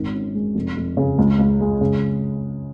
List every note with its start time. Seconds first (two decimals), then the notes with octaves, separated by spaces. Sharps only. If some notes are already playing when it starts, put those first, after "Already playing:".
Already playing: G#1 D#3
0.14 C#4
0.35 G#3
0.55 F1
0.77 F1
0.97 C#3
1.18 C#2
1.39 C#2
1.60 G#3
1.81 C#3